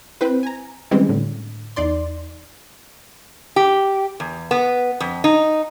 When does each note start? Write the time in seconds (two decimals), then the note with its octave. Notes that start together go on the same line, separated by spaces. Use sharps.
0.21 C4 E4 B4 C5
0.43 G#5 A#5
0.91 D#3 E3 G3 G#3 C4 C#4
1.09 A2 D3
1.76 E2 D#4 D5 C6
3.56 G4
4.20 E2
4.51 B3
5.00 F2
5.24 D#4